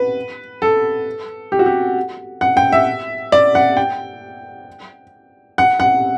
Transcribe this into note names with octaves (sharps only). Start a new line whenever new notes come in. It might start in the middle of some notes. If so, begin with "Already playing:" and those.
Already playing: B4
A4
G4
F#4
G4
F#5
G5
E5
D5
F#5
G5
F#5
F#5